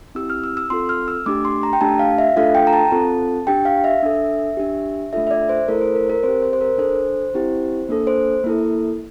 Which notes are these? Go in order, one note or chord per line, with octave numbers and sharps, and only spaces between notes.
C4 E4 G4 E6
F6
E6
E6
C4 F4 A4 C6
F6
E6
A3 D4 G4 D6
C6
A#5
G5
A3 D4 G4 A5
F5
E5
A3 D4 F4 A4 F5
G5
A#5
A5
C4 F4 A4
D4 G4 G5
F5
E5
D4 A4
D4 G4
A3 D4 F4 A4 E5
E5
D5
C5
A3 E4 A4 A#4
C5
A#4
A#4
C4 G4 C5
C5
C5
A#4
D4 A4 C5
C4 E4 G4
A#3 D4 A4
C5
A#3 E4 A4